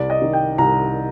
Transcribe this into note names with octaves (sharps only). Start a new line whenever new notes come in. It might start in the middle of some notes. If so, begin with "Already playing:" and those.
Already playing: C2 D5
D#5
D#3
G5
C2 A#5